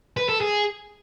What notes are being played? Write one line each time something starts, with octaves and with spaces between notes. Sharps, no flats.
B4
A4
G#4